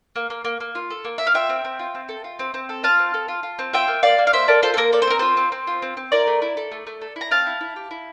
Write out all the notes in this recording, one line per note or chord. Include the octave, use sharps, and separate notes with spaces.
A#3
A#3
A#3
A#3
F4
A4
A#3
A#3 E5
F5
F4 E5 G5
C4
C4
F4
C4
A4
F4
C4
C4
A4
F4 F5 A5
C4
A4
F4
F4
C4
F4 E5 G5
A#3
A#3 D5 F5
A#3
F5
A#3 C5 E5
A4 A#4 D5
F4 A4 C5
A4
A#3 A#4
A4 D5
C5
C4 A#4
F4 A4 C5
C4
C4
F4
C4
C4
E4 A#4 D5
A3
E4
A4
A3
A3
A4
E4 A#5
C4 F5 A5
E4
E4
G4
E4